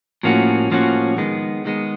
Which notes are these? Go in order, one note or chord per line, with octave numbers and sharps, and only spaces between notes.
A2 F3 A#3 C#4 F#4
A2 F3 A#3 C#4 F#4
D#3 G#3 B3
D#3 G#3 B3